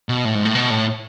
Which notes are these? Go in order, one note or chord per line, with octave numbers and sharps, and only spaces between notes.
B2
A2
G#2
A2
B2
A2